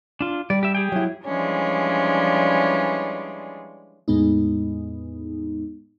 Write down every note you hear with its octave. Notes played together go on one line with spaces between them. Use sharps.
D4 F4
G3 D5
G4 E5
G4 G#4 G5
F#3 E4
E3 F3 G3 G#3 C#4 D4
E2 A2 G#3 B3 D#4